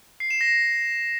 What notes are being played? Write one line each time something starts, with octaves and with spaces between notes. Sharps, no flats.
C7
E7
A#6